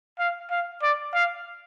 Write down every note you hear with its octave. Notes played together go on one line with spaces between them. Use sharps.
F5
F5
D5
F5